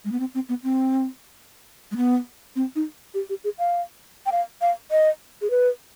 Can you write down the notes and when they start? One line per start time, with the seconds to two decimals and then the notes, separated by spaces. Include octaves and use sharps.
0.05 G#3
0.12 B3
0.20 C4
0.34 C4
0.49 B3
0.63 C4
1.91 G#3
1.97 B3
2.56 C4
2.76 D#4
3.14 G4
3.30 G4
3.44 G#4
3.59 F5
4.26 G5
4.32 F5
4.62 F5
4.91 D#5
5.42 G#4
5.50 B4